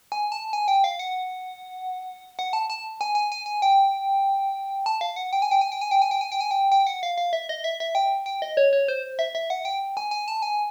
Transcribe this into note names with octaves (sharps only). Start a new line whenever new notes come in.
G#5
A5
G#5
G5
F5
F#5
F#5
A5
A5
G#5
G#5
G#5
G#5
G5
A5
F5
F#5
G5
G#5
G5
G#5
G5
G#5
G5
G#5
G5
G#5
G5
G#5
G5
G5
F#5
F5
F5
E5
D#5
E5
E5
G5
G5
D#5
C#5
C#5
C5
E5
E5
F#5
G5
G#5
G#5
A5
G#5